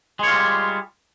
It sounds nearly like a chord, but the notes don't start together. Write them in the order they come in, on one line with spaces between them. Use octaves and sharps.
G#3 C#5 F4 G3